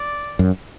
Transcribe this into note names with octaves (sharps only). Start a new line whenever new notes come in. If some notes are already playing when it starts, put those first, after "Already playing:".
Already playing: D5
F#2